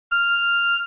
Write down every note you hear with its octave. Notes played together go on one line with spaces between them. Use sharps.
F6